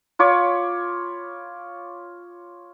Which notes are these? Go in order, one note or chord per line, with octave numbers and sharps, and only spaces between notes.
F4 C#5 B5 D6